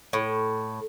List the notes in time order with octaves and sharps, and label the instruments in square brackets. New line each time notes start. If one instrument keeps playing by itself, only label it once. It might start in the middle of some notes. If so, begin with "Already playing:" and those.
[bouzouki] A2